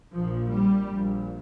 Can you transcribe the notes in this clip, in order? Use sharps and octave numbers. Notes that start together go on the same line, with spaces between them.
A#1 A#2 F3
G3
A#1 A#2